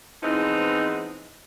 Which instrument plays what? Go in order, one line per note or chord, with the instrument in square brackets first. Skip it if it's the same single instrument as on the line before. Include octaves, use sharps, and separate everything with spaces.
[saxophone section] E3 F3 G#3 B3 C4 D#4